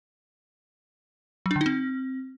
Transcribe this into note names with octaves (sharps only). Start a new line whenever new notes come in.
F#3
D4
D3
D#4
C4